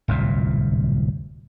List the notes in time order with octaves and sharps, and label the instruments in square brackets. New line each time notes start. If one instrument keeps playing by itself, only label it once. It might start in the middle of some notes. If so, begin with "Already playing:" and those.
[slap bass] D1 C2 F#2 A#2